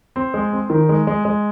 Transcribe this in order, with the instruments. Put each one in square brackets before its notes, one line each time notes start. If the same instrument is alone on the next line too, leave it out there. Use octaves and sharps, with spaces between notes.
[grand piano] C4
G#3
C4
D#3
G#3
G#3
G#3